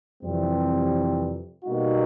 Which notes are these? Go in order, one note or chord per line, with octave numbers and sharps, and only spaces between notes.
F2 C3 E3 G3 C4
B2 G3 A#3 D#4 F#4